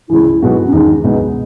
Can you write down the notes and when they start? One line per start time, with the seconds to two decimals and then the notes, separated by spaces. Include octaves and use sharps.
0.10 C#2 C#3 E3 E4
0.42 B1 B2 G#3 B3 F#4
0.67 C#4
0.72 E2 D#3 G#3 D#4
1.04 C#2 B2 G#3 B3 D#4